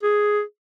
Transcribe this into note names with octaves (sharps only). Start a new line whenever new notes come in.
G#4